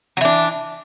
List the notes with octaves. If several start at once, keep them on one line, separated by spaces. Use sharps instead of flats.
E3 F#3 D4